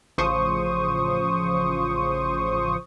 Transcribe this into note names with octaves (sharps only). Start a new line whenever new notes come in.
A1 C#3 F3 C5 C#6 D#6